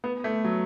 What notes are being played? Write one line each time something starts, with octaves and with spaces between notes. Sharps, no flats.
B3
A3
F#3